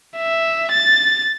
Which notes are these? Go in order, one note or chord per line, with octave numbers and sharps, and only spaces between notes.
E5
A6